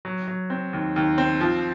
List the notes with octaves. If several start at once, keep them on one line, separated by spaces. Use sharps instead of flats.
F#3
F#3
C4
D#2
D#2
C4
F3